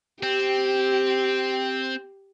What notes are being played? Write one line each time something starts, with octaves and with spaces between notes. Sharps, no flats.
C4 G4